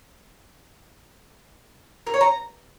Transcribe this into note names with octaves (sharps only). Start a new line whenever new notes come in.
A#4
C#5
A#5